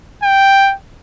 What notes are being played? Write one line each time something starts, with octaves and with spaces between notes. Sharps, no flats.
G5